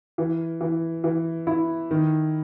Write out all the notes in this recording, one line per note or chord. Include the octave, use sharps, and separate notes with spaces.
E3
E3
E3
E4
D#3